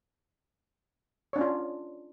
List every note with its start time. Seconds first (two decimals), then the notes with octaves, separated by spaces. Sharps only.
1.33 C#5
1.36 D4
1.38 C#4
1.41 F4